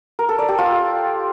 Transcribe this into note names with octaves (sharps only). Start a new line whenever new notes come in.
A#4
A4
D5
G4
F4